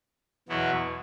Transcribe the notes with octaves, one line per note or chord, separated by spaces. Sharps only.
E2 B2 F#3 B3 E4